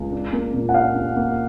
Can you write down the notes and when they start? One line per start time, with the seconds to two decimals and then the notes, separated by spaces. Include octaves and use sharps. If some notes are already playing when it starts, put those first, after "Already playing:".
Already playing: C#2
0.12 D4
0.33 A#3
0.54 A#2
0.69 F#5
0.74 D4 F5
0.95 D4
1.16 A#3